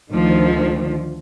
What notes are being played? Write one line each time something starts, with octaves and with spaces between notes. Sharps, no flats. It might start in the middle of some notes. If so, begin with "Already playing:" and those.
D2 D#3 F3